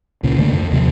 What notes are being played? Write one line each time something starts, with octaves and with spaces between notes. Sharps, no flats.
C#2 A#2 C#3
G1 D3 A3 A#3
F2
D#2 C3 F3